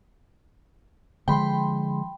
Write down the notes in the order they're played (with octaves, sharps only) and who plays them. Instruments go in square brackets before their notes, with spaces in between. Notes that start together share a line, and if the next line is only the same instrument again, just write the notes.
[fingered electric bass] D3 F3 G#3 [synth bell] G5 B5 C6